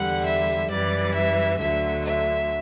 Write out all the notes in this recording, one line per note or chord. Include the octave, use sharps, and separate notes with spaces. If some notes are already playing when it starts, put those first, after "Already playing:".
Already playing: E2 D3 G3 F#5
E5
F#2 E3 G3 D5
E5
D2 D3 F#3 E5
E5